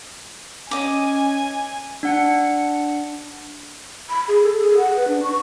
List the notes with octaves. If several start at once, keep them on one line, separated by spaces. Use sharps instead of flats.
C#4 D#5 G#5 D6
D4 F#5 C#7
B5
G#4
A4
G#4
F#5
B4
D4
C#6